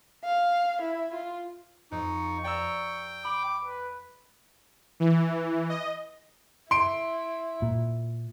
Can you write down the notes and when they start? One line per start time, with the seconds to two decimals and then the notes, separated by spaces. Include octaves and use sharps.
0.24 F5
0.81 E4
1.14 F4
1.92 F2 D#4 C#6
2.44 D5 G5 A#5 E6
3.25 B5 D6
3.65 B4
5.00 E3
5.69 D#5
6.71 E4 C6 D7
7.62 A#2